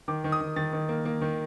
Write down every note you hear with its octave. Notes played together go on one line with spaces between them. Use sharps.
D#3 D6
D#3
D#6
D#3
D#3 A6
D#3
A#3
A#3
D#3